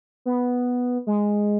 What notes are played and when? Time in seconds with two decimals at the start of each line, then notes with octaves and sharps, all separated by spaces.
0.26 B3
1.07 G#3